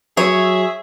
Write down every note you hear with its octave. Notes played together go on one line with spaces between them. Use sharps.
F#3 G#4 C#5 E5